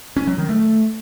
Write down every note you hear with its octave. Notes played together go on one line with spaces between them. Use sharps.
C#4
F#3
D#3
A3